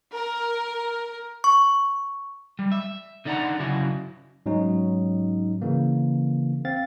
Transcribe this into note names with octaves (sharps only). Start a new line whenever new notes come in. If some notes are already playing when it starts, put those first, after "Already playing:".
A#4
C#6
G3
E5
D3 D#4 D5 E5 F#5 A#5
C#3 F#3 E4 F#4
G#2 F#3 C#4 D#4
C#3 E3 A#3
C4 F5 A6